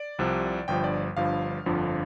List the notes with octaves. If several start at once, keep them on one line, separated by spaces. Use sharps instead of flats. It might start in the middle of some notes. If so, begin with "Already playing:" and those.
Already playing: D5
C2 C3 F3
G1 G2 F3 G5
D5
G1 G2 F3 F5
G1 F2 D3 F3